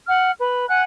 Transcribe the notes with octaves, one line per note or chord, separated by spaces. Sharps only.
F#5 F6
B4
F#5 G#5 F#6